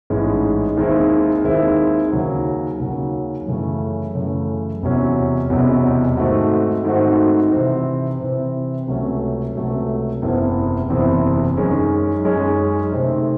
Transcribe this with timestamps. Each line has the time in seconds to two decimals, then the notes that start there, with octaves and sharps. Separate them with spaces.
0.10 A1 G#2 E3 G#3 C#4
0.77 D#2 D#3 G#3 C4 E4
1.45 D#2 D#3 G#3 C4 E4
2.12 D#2 C#3 F#3
2.80 D#2 C#3 F#3
3.47 F#2 C#3 E3 A3
4.15 F#2 C#3 E3 A3
4.82 E1 E2 C3 F#3 C#4
5.50 E1 E2 C3 F#3 C#4
6.17 G#2 D#3 A3 C4 F#4
6.85 G#2 D#3 A3 C4 F#4
7.52 C3 E3 C4
8.20 C3 E3 C4
8.87 C#2 C3 F#3 A3 C#4
9.55 C#2 C3 F#3 A3 C#4
10.22 F#1 E2 C3 E3 C4
10.90 F#1 E2 C3 E3 C4
11.57 F#2 D#3 G#3 C#4
12.25 F#2 D#3 G#3 C#4
12.92 C3 D#3 A3 C4